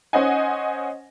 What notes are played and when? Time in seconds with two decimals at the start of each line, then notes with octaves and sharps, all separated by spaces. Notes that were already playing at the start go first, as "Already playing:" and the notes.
0.13 C#4 C5 D#5 F#5 G#5